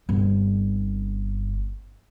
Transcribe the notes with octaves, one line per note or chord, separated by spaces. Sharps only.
G1 C4